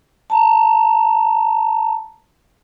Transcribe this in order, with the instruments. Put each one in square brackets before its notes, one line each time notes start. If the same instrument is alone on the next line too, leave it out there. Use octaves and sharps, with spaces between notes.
[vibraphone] A5 A#5